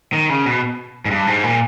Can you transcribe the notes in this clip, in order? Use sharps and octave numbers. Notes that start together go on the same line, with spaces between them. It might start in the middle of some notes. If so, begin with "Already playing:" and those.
D#3
C#3
B2
G#2
G2
G#2
A#2